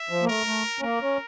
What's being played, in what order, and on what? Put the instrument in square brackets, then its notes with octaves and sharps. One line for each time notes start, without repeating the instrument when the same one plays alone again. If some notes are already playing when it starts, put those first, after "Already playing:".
Already playing: [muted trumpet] E5
[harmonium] F3
A#3
[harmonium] A3 [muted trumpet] A#4
[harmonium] A3
C#4
[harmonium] A#3 [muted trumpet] A#4
[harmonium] C#4